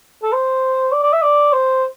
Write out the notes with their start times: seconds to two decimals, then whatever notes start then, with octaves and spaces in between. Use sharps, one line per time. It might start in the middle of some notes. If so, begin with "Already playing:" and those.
0.23 A4
0.33 C5
0.92 D5
1.03 D5
1.13 E5
1.23 D5
1.53 C5